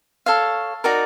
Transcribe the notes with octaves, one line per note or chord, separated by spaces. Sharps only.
A4 C#5 F5
D#4 F#4 A#4 D5